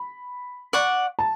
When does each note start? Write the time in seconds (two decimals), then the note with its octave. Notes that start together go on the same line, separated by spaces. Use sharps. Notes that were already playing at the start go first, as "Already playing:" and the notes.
Already playing: B5
0.73 D5 F#5 C#6
1.19 A5